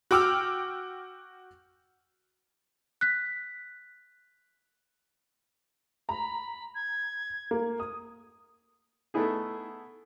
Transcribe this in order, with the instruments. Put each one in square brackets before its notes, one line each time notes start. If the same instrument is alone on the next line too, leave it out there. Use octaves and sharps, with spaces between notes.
[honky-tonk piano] F#4 G5 D6 E6 F6
[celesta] F#6 B6
[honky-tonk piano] A#5 [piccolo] B5
[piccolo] G#6
[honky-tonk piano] A#3
D#6
[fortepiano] A3 B3 D#4 E4 G#4